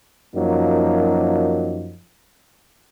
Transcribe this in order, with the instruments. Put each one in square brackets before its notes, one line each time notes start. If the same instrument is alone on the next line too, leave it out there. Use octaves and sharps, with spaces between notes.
[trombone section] F#2 F3 F#3 A#3 D#4